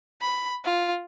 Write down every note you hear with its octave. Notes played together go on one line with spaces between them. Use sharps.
B5
F4